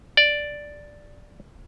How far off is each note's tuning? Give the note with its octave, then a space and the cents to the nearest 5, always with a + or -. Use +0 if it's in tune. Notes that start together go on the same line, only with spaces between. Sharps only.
D5 +0